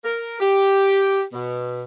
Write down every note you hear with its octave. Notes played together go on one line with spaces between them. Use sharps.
A#4
G4
B2